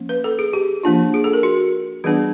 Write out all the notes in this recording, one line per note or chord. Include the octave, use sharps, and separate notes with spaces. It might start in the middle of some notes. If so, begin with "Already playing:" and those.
Already playing: F3 A#3 C#4
B4
A4
G#4
G4
F3 A#3 D4 F4
G#4
A4
A#4
F#4
E3 G3 B3 D4 G#4